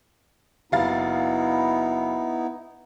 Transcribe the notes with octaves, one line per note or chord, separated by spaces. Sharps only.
F#1 B3 D#4 E4 F5 A6